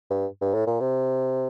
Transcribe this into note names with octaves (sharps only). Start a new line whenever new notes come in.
G2
G2
A2
A#2
C3